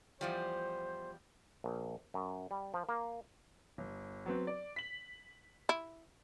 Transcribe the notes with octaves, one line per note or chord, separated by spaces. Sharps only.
E2 F3 G3 C5
A#1
F#2
G3
F3
A#3
G1
F#3 B3 C4
D5
B6 F#7
E4